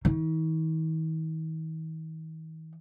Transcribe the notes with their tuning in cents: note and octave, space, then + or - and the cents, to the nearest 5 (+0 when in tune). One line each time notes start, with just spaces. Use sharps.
D#3 +45